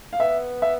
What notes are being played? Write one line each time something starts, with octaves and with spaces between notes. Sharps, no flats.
F5
B3 E5
E5